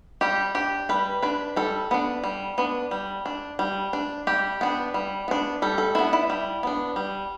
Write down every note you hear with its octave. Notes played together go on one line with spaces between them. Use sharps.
G3 G4
D4 G4
G3 B4
D4 B4
G3 A4
B3 D4
G3
B3 D4
G3
D4
G3
D4
G3 G4
B3 D4
G3
B3 D4
G3 A4
A4
B3 D4 E4
E4
G3
B3 D4
G3